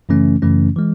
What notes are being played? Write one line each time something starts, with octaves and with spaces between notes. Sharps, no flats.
F#2 C#3 E3 A3 C#4
F#2 C#3 E3 A3 C#4
E3 G#3